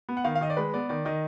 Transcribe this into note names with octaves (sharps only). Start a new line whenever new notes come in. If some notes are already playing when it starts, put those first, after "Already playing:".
B3
F#5
D#3 F5
F5
D#3 D#5
D5
G#3 B4
B3 D5
D#3 D5
D#3 D#5